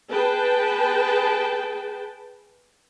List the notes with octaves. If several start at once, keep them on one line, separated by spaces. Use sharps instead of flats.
G#4 B4 G5 A5